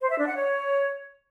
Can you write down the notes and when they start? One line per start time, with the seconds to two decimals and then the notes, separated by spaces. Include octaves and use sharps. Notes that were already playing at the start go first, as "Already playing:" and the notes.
0.01 C5
0.10 E5
0.18 D4
0.27 F#5
0.36 C#5